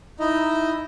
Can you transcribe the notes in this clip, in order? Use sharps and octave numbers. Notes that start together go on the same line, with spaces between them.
D#4 E4 D#5